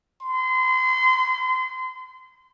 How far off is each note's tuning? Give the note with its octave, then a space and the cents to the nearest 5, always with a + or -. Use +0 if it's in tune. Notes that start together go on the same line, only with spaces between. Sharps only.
C6 -30